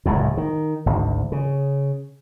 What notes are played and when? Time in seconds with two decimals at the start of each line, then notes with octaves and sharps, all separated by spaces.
0.06 D1 C#2 F#2 A2
0.37 D#3
0.86 G#1 D2
1.32 C#3